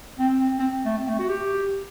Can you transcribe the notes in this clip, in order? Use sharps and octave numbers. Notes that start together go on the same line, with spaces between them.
C4
C4
A3
C4
A3
F#4
G4